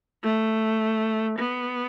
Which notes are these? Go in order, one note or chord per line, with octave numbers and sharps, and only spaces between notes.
A3
B3